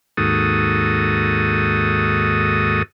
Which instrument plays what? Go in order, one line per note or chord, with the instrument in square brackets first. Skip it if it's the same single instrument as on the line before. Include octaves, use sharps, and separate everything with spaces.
[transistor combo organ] D#2 G#2 F#4 A4 D#6